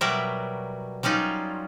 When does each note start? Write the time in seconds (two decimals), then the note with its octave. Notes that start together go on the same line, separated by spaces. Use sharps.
0.01 B2 F#3 G3 A#4 E5
1.03 F#3 G3 C#4 D#4 F4